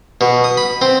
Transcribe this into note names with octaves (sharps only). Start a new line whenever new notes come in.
B2
D#6
B5
C4